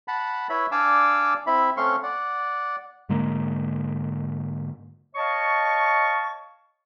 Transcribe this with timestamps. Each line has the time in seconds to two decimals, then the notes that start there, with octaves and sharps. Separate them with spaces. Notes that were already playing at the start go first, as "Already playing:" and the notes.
0.08 F#5 A5 B5
0.49 E4 B4 C#5 E5 B5
0.72 D4 D5 F5 G#5 D6 E6
1.47 C4 E4 E5 B5
1.77 A3 C4 C#4 F5 C6 C#6
2.03 D5 F#5
3.09 G#2 D3 G#3 A#3
5.15 C#5 D#5 F5 A5 C#6